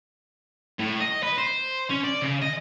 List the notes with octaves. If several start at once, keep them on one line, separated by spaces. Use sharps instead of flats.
A2
D#5
B4
C5
C#4
D5
C#3
D#5